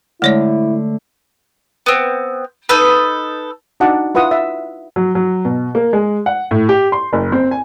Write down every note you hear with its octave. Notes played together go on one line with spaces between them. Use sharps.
D3 G#3 A3 E4 C#5 D5
B3 C4
D#4 A4 B4
D4 D#4 F#4 F#5 A5 D6
E4 F4 B4 F#5 D#6
E5
F#3
F#3
B2
A#3
G#3
F#5
A2
G4
C6
F#1
C4
G#5